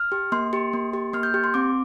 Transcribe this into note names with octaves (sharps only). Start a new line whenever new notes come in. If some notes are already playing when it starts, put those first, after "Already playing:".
Already playing: F6
G4
A#3 C6
G4
A#3
G4
A#3 F6
G6
G4
C6
C4 D6